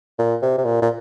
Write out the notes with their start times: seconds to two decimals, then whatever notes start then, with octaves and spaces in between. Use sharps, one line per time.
0.19 A#2
0.42 C3
0.58 C3
0.65 A#2
0.82 A#2